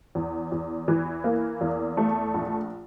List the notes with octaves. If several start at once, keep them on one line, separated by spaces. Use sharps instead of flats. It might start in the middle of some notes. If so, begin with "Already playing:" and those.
E2
E2
E3
A#3
E2
A3
A#1